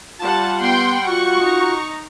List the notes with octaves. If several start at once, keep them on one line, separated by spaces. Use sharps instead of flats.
G3 F4 F#5 A5
B3 G5 C6
F4 F#4 C#6
D#4 A#5